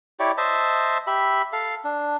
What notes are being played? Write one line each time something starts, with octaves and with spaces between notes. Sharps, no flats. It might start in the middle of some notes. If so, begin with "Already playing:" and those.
E4 G4 C#5 D5
C5 D#5 E5 A5
G4 E5 B5
A4 F5
D4